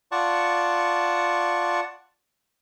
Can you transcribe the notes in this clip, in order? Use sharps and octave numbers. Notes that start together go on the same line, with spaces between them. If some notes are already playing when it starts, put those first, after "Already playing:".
F4 D5 F#5 A5 C#6